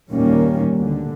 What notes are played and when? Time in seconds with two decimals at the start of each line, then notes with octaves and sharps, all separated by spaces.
0.11 D#2 A#2 D#3 G3 A#3 C#4
0.76 D2 D3